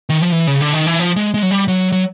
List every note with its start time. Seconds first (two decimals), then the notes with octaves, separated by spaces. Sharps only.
0.10 D#3
0.23 F3
0.32 E3
0.47 C#3
0.61 D3
0.73 D#3
0.87 E3
1.00 F3
1.16 G#3
1.34 G#3
1.43 F#3
1.51 G3
1.68 F#3
1.92 F#3